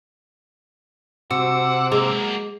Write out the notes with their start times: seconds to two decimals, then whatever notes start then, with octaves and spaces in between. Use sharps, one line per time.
1.31 C3 F#4 F#5 D6 E6
1.92 F#3 G#3 A#3